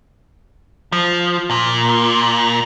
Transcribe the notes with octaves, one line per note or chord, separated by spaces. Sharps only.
F3
A#2